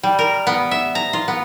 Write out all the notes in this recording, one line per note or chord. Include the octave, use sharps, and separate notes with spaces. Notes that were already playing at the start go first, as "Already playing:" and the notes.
G3
A#4
B3
E5
A#5
F4
B3